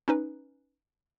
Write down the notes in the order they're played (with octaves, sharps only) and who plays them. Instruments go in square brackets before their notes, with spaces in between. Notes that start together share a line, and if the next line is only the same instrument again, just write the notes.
[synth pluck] C#4 D#4 B4